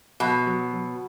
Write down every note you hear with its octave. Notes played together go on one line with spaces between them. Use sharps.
B2 F#3
F#3
F#3